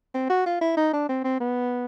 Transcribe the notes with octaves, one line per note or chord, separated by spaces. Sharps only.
C4
F#4
F4
E4
D#4
D4
C4
C4
B3